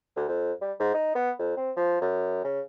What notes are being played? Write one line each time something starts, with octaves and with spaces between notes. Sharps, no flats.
D2
F2
G3
G#2
D#4
B3
F2
C4
F3
F#2
C#3